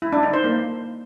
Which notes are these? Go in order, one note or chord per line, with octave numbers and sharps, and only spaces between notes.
E4
D4
D#4
C5
A#3